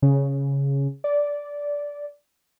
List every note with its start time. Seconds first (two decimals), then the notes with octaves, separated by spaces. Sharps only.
0.02 C#3
1.04 D5